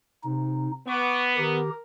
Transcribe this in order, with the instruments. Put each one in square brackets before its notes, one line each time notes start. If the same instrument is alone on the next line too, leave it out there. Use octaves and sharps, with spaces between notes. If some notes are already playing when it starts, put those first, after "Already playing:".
[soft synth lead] C3 [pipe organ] D#4
[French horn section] B3 [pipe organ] C#6 [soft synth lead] D6
[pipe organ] D#3 G4 [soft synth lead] A#4